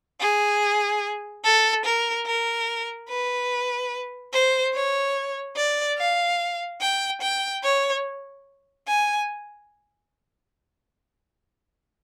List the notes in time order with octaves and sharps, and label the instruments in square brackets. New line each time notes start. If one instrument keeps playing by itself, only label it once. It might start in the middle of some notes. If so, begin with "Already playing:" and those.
[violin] G#4
A4
A#4
A#4
B4
C5
C#5
D5
F5
G5
G5
C#5
G#5